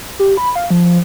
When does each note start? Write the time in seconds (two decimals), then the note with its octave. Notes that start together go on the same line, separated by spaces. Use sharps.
0.19 G4
0.37 B5
0.55 F5
0.70 F3